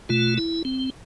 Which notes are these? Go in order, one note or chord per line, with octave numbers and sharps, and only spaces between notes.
B2 A3 F4
E4
C4